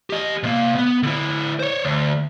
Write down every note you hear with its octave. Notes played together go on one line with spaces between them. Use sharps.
G4 D#5
C3 A#3
B3
D3 E4
C5 C#5
D2